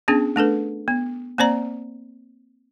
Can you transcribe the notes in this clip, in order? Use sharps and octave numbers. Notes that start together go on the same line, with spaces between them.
B3 C#4 D4 G#4
A3 D4 A4 B4
B3
A#3 C4 C5 D5 A#5